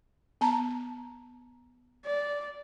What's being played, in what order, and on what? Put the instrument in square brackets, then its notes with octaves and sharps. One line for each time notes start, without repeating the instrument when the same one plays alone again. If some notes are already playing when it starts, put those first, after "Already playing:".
[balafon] B3 A5 A#5
[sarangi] D5